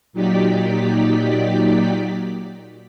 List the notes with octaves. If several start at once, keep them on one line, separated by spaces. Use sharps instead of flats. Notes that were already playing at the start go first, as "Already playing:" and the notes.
A#2 F#3 D#4 G4 D5 B6